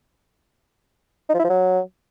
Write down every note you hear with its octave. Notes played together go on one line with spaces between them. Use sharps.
D#4
F3
E4
F3
F#3